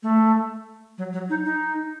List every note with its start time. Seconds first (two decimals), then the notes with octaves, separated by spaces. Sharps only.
0.03 A3
0.98 F#3
1.13 F#3
1.30 D#4
1.45 D#4